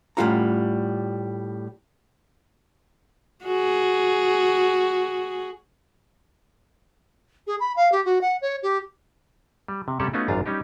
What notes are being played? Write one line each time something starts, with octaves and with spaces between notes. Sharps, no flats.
A2 G3 C#4 F4 F#5 A#5
F#4 G#4
G#4
B5
F5
G4
F#4
F#5
C#5
G4
G3
C3
C3 G3 C#4 G4 A4 F#5
A3 B3 C#4 D#4 F4 F#4
G#1 F#2 D4 F4 F5 A#5
G3 C#4 D#4 G4